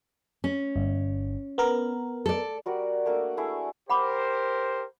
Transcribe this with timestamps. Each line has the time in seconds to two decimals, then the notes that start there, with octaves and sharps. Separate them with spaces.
0.44 C#4
0.76 G1
1.58 B3 A#4
2.26 A4 D5
2.66 G3 F#4 A#4 D5
3.06 A3 A#3 D4
3.37 A3 E4 G#4
3.90 G4 A#4 C5 F#5 B5 D6